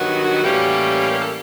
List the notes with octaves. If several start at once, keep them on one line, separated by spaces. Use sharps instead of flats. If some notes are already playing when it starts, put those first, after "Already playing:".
Already playing: G2 D#3 F#3 B3 F#4
A2 E3 G3 A#3 C#4 G4
A#4
A4